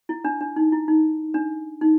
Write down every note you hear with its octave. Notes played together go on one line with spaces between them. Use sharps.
E4
D4
D4
D#4
E4
D#4
D4
D#4